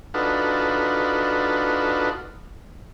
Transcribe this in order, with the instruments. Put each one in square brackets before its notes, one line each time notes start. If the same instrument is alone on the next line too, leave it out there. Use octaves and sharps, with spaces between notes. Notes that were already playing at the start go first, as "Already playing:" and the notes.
[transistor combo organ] D4 D#4 F4 F#4 A4 B4